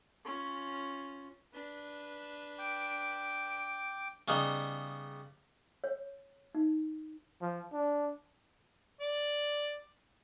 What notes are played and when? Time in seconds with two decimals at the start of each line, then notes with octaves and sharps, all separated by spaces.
0.25 C#4 F4
1.54 D4 B4
2.59 G5 D6
4.28 C#3 G3 B3 D#4
5.84 C#5
6.55 D#4
7.42 F3
7.73 D4
9.00 D5